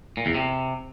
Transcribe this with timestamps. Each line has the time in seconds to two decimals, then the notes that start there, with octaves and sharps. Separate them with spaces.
0.17 A#2
0.26 E2
0.35 C3